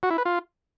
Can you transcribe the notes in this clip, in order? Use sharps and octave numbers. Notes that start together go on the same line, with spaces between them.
F#4
E4
B4
F4